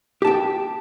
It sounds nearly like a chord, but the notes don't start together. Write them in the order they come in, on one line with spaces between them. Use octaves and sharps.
G4 A5 G5